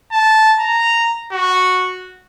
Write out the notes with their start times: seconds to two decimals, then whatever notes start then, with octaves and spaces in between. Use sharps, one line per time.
0.12 A5
0.60 A#5
1.33 F#4